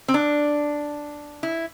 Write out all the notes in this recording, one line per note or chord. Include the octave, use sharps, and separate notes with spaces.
C4
D4
E4